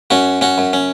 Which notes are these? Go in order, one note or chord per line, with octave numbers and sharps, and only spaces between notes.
F#2 C#4 F#4
C#4 F#4
F#2
C#4